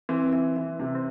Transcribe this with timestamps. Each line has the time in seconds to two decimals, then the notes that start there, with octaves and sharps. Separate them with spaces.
0.09 E3 C4
0.33 E3
0.56 E3
0.79 C3
0.95 C4